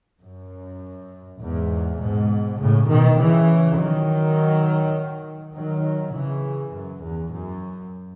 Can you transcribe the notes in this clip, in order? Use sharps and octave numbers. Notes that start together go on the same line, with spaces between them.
F#2
E2 G#2
G#2 B2
A2 C#3
B2 D#3
C#3 E3
D#3 F#3
D#3 F#3
C#3 E3
F#2
E2
F#2